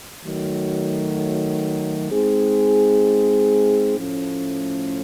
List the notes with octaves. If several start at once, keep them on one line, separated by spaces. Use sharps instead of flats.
D#3 F#3 A3
G#3 C4 D#4 G#4
A2 F3 A3 C#4